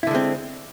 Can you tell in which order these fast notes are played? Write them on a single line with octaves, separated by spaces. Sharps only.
E4 D3 G#3 C4